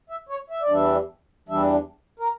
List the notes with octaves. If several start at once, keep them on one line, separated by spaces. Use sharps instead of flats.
E5
C#5
E5
D5
E2 E3 G3 D4 E5
E2 E3 G3 D4 E5
A#4